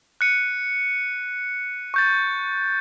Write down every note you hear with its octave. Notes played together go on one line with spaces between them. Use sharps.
F#6 C#7 D#7
C#6 G6 A6